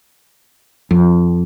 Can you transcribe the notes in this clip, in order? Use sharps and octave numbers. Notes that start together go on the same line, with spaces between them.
F2